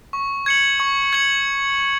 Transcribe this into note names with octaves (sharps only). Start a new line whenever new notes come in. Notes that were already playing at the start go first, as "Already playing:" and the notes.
C#6
G#6 C#7 F#7
C#6
G#6 C#7 F#7